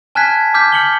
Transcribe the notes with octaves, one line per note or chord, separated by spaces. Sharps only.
G#5 A5 F6 F#6 G#6 B6
D6 F6 G6 B6
F6 C#7 F#7 G7